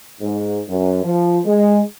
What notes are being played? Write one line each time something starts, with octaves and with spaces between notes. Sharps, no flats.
G#2
F#2
F3
G#3